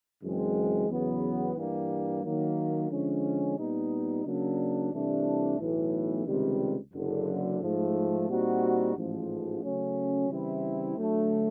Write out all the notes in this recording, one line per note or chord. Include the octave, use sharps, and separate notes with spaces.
F#2 C#3 E3 G#3 C4
E2 C#3 F#3 B3
G2 E3 G3 A#3
D#3 F#3 A#3
D3 F3 G#3 C#4
A#2 G3 B3 D#4
C#3 F#3 A#3 D4
C2 C3 E3 A3 D4
B1 A2 E3
C#2 C3 D#3 G3
F#1 F#2 D3
G#2 F3 A3
A#2 G3 C4 D#4 F#4
A1 G#2 F3
C#3 F#3 A3 C#4
C#3 E3 G3 C4 E4
D2 D3 F#3 A3